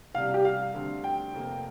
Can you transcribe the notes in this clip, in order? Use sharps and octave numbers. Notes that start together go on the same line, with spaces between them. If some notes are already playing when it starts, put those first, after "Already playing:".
C2 C3 G3 D4 F5
G4
F5
D2 D3 G3 C4
G5
F1 F2 F3 A#3